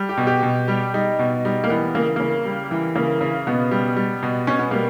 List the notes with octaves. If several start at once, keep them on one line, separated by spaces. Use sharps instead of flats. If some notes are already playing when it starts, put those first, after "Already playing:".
Already playing: G3
G4
B2
G4
B2
G3
G3 D#4
B2
G3 D#4
A#3
E3 B3
C#3 A#3
C#3 A#3
G3
E3
C#3 A#3
C#3
B2 B3
G3
G3
B2
B2 C#4
B3
G3 A#3